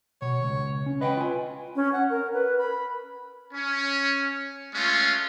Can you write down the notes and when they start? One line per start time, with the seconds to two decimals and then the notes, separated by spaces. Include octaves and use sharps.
0.22 B2 C#5
0.43 C#2
0.86 C#4
1.01 B4 D#5 F#5 G5
1.17 F4 G#5
1.76 C#4
1.92 F#5
2.10 A#4
2.33 B4
2.58 B5
3.54 C#4
4.74 G#3 A3 C#4 F4